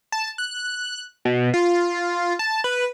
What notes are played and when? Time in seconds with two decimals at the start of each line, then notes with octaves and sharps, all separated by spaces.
0.12 A5
0.38 F#6
1.25 B2
1.54 F4
2.39 A5
2.64 B4